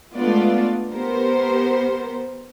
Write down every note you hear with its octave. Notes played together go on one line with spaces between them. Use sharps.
G#3 A3 B3 D4 F4 D5
B3 G4 A#4 C5